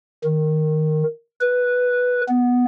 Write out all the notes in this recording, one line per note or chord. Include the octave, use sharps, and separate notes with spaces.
D#3
B4
B3